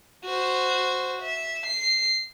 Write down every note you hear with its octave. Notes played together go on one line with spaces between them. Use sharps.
F#4 C5
E5
C7